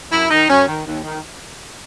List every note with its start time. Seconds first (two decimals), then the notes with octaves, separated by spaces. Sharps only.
0.11 F#2 E4
0.31 D#3 D#4
0.49 F#2 C#4
0.67 D#3
0.86 D#2
1.04 D#3